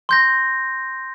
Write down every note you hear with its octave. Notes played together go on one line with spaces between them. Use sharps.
C6 G6 A#6